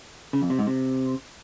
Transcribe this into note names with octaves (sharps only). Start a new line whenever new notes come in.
C#3
F2
C3
G#2
C3